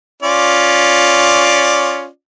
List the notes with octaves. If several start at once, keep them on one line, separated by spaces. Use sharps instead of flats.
C#4 F4 D5